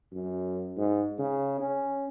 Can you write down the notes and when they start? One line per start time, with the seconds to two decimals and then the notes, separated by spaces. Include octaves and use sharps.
0.13 F#2
0.77 G#2
1.19 C#3
1.60 C#4